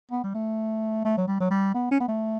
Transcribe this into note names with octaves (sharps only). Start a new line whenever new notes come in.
B3
G3
A3
A3
F#3
G3
F#3
G3
B3
C#4
B3
A3